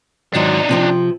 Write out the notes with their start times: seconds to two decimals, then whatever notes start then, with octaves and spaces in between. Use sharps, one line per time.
0.34 G#2 D#3 F#3 D4 D#4
0.69 C3 F3 C4